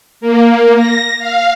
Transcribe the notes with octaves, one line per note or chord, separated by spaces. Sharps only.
A#3
A#6
F5